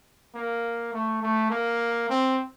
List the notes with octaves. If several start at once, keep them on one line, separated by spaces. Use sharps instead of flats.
A#3
A3
A3
A#3
C4